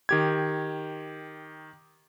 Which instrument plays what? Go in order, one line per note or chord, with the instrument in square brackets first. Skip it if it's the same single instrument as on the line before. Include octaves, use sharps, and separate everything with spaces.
[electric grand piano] D#3 G4 G#6